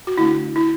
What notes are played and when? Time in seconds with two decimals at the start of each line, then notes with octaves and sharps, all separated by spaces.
0.07 F#4
0.18 D3 A3 D4 E4
0.56 E4